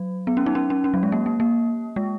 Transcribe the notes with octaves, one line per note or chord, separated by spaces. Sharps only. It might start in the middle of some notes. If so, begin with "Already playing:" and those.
Already playing: F#3
B3
C#4
B3 D#4
C#4
C#4
C#4
F#3
G#3
A#3
A#3
A#3
G#3